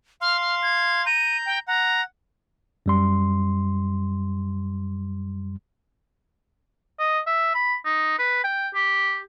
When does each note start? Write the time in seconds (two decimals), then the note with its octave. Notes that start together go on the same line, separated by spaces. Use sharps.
0.21 F5 C6 F6
0.42 F6
0.62 G#6
1.06 A#5 G6 D#7
1.46 G5
1.68 F#5 A#5
2.86 F#2 G3 C6
6.99 D#5
7.26 E5
7.54 B5
7.85 D#4
8.19 B4
8.44 G5
8.74 G4